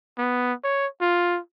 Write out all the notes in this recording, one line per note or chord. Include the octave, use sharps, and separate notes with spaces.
B3
C#5
F4